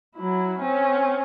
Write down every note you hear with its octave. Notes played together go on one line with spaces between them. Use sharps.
F#3 E4
C4 C#4